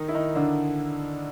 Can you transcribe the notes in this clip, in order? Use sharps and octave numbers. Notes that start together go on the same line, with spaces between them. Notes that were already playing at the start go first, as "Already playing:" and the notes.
Already playing: D#3 D#4
E4
D#3 D#4
D3 D4